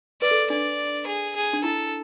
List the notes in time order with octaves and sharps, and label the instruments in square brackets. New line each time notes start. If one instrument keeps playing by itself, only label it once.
[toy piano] B4 [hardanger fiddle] D5
[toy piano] A4
[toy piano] D4 [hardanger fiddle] D5
[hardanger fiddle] G#4
G#4
[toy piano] D4
[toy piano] E4 [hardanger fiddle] A4